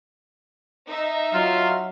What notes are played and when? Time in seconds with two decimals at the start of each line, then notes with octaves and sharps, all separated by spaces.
0.88 D#4 E5
1.33 F#3 F4